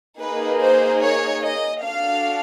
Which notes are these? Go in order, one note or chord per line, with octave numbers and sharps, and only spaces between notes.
A#3 D#4 G#4 B4
C5
C#5
D#5
D4 F#4 A4 F5